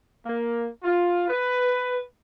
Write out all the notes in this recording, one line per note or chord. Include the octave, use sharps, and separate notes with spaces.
A#3
F4
B4